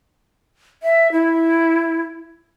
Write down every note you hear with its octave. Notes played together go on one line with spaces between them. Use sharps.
E5
E4